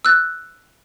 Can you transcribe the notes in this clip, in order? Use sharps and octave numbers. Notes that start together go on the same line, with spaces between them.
E6 F#6 A6